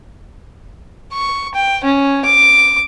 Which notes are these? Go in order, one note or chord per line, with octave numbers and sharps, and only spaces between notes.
C#6
G5
C#4
D6